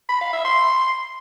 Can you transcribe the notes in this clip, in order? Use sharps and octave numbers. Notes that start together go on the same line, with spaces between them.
B5
F5
E5
C6